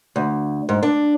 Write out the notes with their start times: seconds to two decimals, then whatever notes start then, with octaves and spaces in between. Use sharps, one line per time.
0.16 D2
0.69 G#2
0.83 D4